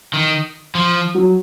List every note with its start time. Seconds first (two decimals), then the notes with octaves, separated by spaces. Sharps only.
0.14 D#3
0.75 F3
1.15 F#3